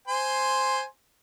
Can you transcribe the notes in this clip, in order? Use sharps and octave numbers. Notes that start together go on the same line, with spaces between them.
C5 G#5 C6